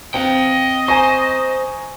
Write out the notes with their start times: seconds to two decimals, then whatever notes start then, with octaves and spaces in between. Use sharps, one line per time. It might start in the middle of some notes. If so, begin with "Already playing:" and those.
0.14 C4 D#5 F5 G5
0.88 C5 G#5 A#5 C#6